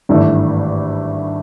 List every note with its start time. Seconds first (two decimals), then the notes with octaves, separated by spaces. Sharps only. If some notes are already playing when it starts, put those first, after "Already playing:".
0.09 G#1 G2 E3 A3